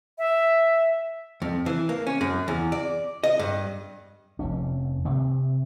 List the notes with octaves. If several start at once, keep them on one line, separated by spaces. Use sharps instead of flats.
E5
F2
E3
A#3
C#4
F#2
E2
D5
D#5
G2
F1 F2 C#4
C3 C4